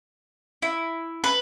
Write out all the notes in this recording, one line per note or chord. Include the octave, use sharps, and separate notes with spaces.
E4
B4